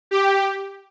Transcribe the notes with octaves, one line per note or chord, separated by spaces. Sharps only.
G4